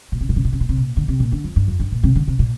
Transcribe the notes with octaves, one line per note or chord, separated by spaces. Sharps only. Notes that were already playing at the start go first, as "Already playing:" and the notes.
A#2
C3
A#2
C3
A#2
C3
A#2
C3
A#2
D3
C3
A#2
D3
F2
G2
F2
G2
A#2
C3
D3
C3
A#2